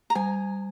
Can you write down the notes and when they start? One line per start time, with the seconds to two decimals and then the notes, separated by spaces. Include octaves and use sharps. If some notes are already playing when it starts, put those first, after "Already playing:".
0.10 A#5
0.15 G3 G#5